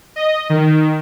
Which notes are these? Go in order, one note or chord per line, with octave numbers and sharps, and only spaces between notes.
D#5
D#3